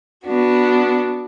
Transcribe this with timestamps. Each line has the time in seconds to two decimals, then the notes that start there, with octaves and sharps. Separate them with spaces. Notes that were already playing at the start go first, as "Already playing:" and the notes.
0.24 B3 D4 F#4